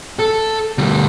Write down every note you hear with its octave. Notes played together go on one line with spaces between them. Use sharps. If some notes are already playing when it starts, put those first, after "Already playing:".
A4
D2 G3